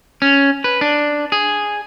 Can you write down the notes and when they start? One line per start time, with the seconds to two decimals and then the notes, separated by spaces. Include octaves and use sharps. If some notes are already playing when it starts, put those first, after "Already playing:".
0.22 C#4
0.64 B4
0.81 D4
1.32 G#4